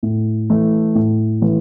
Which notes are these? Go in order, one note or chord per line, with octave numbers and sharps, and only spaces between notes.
A2
E3 A3
A2
E3 A3